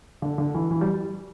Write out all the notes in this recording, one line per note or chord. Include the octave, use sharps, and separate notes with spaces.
D3
D3
E3
E3
G3